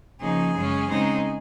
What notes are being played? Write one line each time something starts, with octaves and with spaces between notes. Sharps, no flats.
C#3 F3 A#3 D#4 G#4
F#2 C#3 G#3 C#4
C#3 G#3 C4 D#4